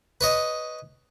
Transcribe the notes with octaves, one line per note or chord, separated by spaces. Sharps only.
B4 C#5 D#5